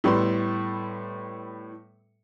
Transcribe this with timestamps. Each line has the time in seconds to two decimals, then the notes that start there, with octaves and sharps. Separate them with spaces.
0.04 A2 G3 B3 A4 C6